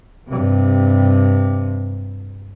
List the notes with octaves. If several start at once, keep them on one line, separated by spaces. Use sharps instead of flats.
G2 C3